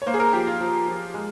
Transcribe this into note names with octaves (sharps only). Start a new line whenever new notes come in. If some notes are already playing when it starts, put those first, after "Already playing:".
C#5
A#3 C5
G#4
A#4
F3 G4
F4
F3
F3
G#3